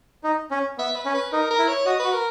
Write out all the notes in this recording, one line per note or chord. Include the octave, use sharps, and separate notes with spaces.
D#4
C#4
B3 E5
B4
C#4
B4
D#4 A#4
A#4
E4
C#5
F#4 D#5
F#4 B4
A#4